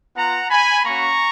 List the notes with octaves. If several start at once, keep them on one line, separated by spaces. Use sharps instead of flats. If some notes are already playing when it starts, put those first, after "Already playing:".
B3 F4 F#5 A#5
G#5 B5
A#3 C#4 F#4 A#5 C#6